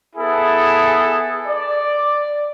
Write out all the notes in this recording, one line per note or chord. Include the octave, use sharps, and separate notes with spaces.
B3 E4 G#4 A4
D5